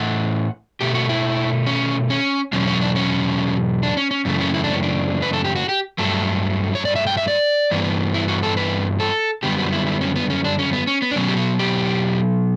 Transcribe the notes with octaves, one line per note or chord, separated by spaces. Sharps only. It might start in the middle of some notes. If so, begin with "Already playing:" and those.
Already playing: A2 E3 A3 F#5
B2 A3 G4
F#4
E4
C#4
C#4
E2 B2 F#3 C#4
C#4
D4
C#4
D4
C#4
C#4
F#2 C#3 E3 A3 B3
C#4
E4
D4
C#4
D4
B4
A4
G4
F#4
G4
G2 F#3 A3 A4
C#5
D5
E5
G5
E5
D5
G2 E3 B3
E4
F#4
A4
B4
A4
F#2 D3 G3 B3 G4
F#4
E4
E4
C#4
B3
C#4
D4
C#4
B3
C#4
B3
D4
B2 F#3 B3 C#4
G4
F#4
G4